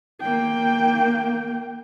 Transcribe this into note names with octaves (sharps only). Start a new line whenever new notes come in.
A#3 G5